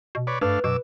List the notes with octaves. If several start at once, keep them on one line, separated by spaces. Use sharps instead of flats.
B2
B4 C#5 D5
G2 A3 D4 B4 F5
F#2 B2 D6 E6